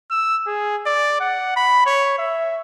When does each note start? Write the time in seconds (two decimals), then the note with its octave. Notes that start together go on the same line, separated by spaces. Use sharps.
0.10 E6
0.47 G#4
0.86 D5
1.20 F#5
1.56 B5
1.86 C#5
2.18 E5